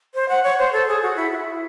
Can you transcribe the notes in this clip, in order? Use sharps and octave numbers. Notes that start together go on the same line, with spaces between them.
C5
F#5
C#5
C5
A4
G#4
F#4
E4
F#4
E4